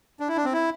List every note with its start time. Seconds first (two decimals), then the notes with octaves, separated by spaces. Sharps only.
0.20 D4
0.29 E4
0.37 D4
0.45 C4
0.53 E4